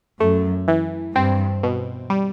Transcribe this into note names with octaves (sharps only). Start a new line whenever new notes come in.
F#2 A3
E3
G2 C4
B2
G3